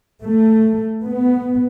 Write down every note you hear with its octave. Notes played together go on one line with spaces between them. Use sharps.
A3
B3